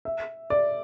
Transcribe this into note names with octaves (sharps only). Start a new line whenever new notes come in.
E5
D5